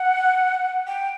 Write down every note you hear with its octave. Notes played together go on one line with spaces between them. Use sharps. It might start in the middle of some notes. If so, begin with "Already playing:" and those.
Already playing: F#5
G5